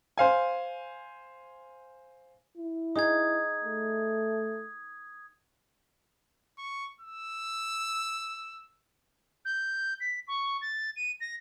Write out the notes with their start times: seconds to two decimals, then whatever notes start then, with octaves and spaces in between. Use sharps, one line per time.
0.17 C5 F5 G#5
2.57 E4
2.96 D#4 G#4 D#6 G#6
3.65 A3
6.58 C#6
7.01 E6
9.45 G6
10.00 B6
10.27 C#6
10.61 A6
10.96 D#7
11.20 A#6